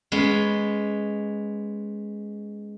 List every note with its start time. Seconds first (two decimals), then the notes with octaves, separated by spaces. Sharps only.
0.12 G#3 B3 C#4